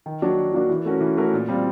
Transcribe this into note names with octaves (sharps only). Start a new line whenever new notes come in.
D#3
F#3 A#3 D4 F#4
D#3
F#3 A#3 D4 F#4
E3
A3 C#4 F#4 A#4
E3
A3 C#4 F#4 A#4
A#2
G3 C4 F4